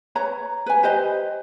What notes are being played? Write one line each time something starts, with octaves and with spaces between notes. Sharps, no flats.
B4 C#5 A#5
B4 G#5
G4 B4 C5 D#5